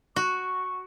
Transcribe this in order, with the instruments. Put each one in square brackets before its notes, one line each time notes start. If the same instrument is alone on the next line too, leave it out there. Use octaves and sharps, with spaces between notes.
[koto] F#4 [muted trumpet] C#6